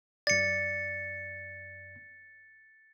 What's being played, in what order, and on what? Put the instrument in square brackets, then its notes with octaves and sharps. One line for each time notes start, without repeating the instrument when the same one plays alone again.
[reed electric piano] F#2 D5 [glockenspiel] A6 C#7